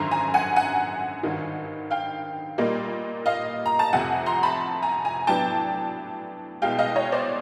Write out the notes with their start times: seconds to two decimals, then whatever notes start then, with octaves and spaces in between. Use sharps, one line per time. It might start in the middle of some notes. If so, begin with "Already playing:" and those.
Already playing: G#1 F#2 D3 A#5 C6
0.11 G#5 A#5
0.34 F#5 G#5
0.56 F#5 G#5
1.23 G#1 G2 D#3
1.91 F5 G5
2.58 A#2 G3 A#3 D#4
3.26 D#5 F5
3.66 A#5
3.79 A5
3.93 F1 F2 C3 F#5 G#5
4.26 A#5 C6
4.43 A5 B5
4.82 G#5 A#5
5.05 G#5 A#5
5.27 A2 F#3 B3 D4 G5 A5
6.62 C2 B2 G#3 F5 G5
6.79 D#5 F5
6.96 C#5 D#5
7.12 C5 D5